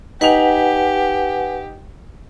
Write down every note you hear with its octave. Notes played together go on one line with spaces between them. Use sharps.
D#4 G4 B4 F#5 G#5 F7